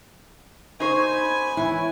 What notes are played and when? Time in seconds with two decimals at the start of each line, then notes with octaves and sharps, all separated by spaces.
0.80 D#4 C5 G#5 C#6
1.11 B5
1.57 E3 E4 C#5